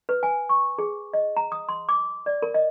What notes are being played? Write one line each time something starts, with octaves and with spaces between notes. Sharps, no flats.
B4
G#5
C#6
G#4
D#5
A#5
D#6
C6
D6
D5
A#4
D#5